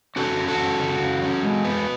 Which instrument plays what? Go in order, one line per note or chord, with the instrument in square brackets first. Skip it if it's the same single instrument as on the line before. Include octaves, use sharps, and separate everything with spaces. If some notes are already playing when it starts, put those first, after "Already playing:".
[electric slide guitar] C#4 F#4 A4
C#4
F#4 A4
C#4
C#3
C#3
C#4
G#3
B3